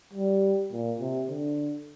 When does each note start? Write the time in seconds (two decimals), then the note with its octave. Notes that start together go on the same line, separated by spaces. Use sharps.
0.14 G3
0.72 A#2
1.01 C3
1.30 D3